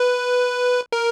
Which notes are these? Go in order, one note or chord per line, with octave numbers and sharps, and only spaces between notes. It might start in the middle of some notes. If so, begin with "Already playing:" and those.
Already playing: B4
A#4